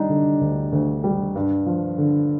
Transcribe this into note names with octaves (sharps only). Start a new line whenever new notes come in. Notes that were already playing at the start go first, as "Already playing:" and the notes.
Already playing: G3 D4 D#4
D3
D2
D2
G3
G2
F3
D3